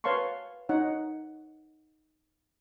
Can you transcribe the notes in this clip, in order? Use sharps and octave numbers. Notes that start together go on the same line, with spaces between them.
B4 C#5 F5 A5 C6 C#6
D#4 C#5 F#5